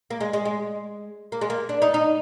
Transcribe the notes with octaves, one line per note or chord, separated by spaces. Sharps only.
A#3
G#3
G#3
G#3
A#3
G#3
A#3
D4
D#4
D#4